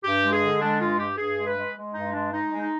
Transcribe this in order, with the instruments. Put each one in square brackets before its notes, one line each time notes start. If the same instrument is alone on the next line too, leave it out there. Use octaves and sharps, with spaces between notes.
[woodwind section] G2 G4
G#3
G#4
D3
G#3 D4
G2 F4
G2 G4
G2 G#4
G#3
B4
G#3
G#3
G2 D#4
G#3 D4
G#3 D#4
G#3
D#4